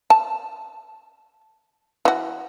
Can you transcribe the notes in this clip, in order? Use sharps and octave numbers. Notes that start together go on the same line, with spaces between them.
A5
E3 F#4